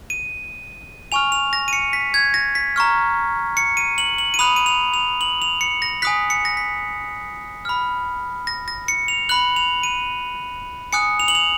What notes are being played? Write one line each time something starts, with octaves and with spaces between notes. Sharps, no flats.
D#7
G#5 C#6 F6 F7
F7
A#6
D#7
C#7
B6
G#6
A#6
B6
A#5 C#6 F6
C#7
D#7
F#7
F#7
D#7
B5 D#6 F#6 F7
D#7
F7
F7
F#7
F7
C#7
A#6
G#5 D#6 F#6 B6
C#7
A#6
B6
B5 F6
A#6
A#6
C#7
F7
B5 F#6 F#7
F7
D#7
G#5 D#6 F#6 C#7
F7
F#7
F7